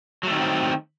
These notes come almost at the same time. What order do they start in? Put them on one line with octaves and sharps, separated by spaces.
F#3 A3 D#3 C#4 C4